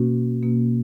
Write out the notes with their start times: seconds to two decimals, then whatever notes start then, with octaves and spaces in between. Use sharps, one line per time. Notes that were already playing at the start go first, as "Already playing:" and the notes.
Already playing: B2 A#3 C#4 F#4
0.43 B2 A#3 C#4 F#4